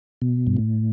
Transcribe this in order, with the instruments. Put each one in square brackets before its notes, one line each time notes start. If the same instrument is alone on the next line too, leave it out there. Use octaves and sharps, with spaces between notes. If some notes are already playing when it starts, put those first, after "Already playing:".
[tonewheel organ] B2
G2
A2